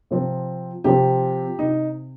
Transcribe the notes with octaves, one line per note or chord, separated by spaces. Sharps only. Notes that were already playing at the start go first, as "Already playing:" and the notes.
C3 F3 C4
C3 F3 C4 G4
C3 D#4